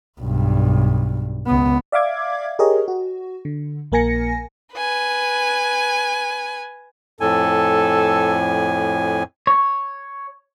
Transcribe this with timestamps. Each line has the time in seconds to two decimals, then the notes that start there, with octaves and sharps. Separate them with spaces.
0.20 B1 G2
1.46 C#2 B3
1.92 D5 E5 F5 D6 G#6
2.59 G4 G#4 A#4 C#5 D#5
2.88 F#4
3.45 D3
3.92 A#1 A#3 A#4 G#5 A#6 C#7
4.74 B4 G#5
7.20 F2 A2 A4 G#5
9.47 C#5